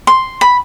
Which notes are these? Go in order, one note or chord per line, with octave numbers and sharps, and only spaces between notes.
C6
B5